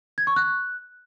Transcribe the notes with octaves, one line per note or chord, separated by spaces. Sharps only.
G#6
C#6
F#6